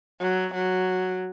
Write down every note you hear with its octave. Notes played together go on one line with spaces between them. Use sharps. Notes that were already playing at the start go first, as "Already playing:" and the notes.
F#3
F#3